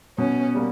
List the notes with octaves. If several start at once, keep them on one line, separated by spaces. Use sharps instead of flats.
B2 C#4
G3 A#3